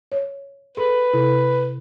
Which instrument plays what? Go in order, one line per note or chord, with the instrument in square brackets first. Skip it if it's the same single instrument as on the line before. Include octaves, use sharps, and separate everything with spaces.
[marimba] C#5
[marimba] G#4 A4 C6 [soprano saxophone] B4
[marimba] C3 E4 A4